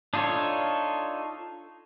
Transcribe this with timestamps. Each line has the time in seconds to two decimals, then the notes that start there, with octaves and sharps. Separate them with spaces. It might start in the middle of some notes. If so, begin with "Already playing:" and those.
0.14 D4 D#4 F4 A4 C#5